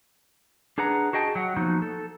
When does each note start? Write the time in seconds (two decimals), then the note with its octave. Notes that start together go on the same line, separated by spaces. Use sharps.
0.78 D4 G#4 B4 F#5 A#5
1.13 F#4 G#4 D#5 G5 A5
1.35 F#3 F#5
1.56 F3 A#3 B3 D#4 F#4
1.82 A4